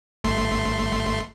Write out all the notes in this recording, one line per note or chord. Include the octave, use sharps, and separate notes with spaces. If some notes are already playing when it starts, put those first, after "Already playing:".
G1 A3 C6